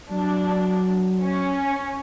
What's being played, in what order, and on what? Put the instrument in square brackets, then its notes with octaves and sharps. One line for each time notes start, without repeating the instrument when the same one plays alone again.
[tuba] F#3 [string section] D4
[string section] C#4